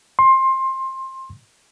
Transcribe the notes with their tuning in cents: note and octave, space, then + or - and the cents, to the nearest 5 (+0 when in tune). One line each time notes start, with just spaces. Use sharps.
C6 +20